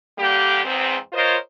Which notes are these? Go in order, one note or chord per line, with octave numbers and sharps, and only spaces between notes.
D3 G3 A#3 G4
E2 G#2 C4
F4 A#4 C5 C#5 D#5